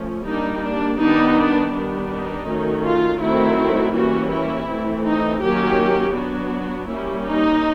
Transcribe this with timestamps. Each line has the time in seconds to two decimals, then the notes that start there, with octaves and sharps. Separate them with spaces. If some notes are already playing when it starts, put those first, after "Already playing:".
Already playing: F3 A3 C#4
0.25 G3 A#3 D4 D#4
0.62 D4
0.99 D#3 G3 B3 D4 D#4
1.36 D4
1.73 D#3 G3 B3 D4
2.10 D#4
2.46 D#3 F#3 A3 C#4
2.83 F4
3.20 D#3 F#3 A3 C4 E4
3.93 E3 G3 A#3 C#4 F#4
4.31 E4
4.67 E3 A3 C4
5.04 D#4
5.41 D#3 F#3 A#3 C#4 G4
6.14 F#3 B3 D4 F#4
6.88 G3 A#3 C#4 E4
7.25 D#4